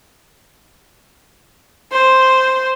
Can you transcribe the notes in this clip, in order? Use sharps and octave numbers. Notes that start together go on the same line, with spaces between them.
C5